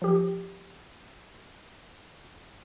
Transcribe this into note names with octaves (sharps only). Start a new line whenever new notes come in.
F3 G4